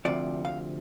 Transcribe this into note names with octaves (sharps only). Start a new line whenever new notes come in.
D2 C3 F3 D5
F5